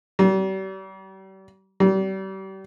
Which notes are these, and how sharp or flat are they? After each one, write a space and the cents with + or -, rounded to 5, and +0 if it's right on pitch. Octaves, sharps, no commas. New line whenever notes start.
G3 -35
G3 -30